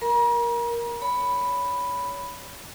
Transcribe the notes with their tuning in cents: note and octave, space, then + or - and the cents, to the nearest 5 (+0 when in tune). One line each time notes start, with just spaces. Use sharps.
A#4 +10 A#5 +45
C#5 +25 B5 +0